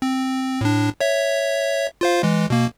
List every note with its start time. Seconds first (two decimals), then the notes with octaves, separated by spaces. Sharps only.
0.02 C4
0.61 A2 D4
1.00 C#5 E5
2.01 F4 C5 F5
2.23 E3 G#3
2.50 B2 A#3